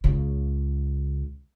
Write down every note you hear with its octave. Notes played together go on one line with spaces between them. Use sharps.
C#2 C#3